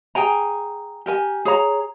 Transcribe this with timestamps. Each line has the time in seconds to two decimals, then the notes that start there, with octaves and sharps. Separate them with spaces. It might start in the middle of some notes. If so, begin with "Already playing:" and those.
0.15 G#4 G5 G#5 A#5
1.06 G4 A#4 G#5
1.45 G#4 C#5 A#5